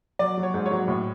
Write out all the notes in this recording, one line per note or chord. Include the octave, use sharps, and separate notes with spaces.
F#3 D5
F#3
C#5
G#2
C#5
F#3
A2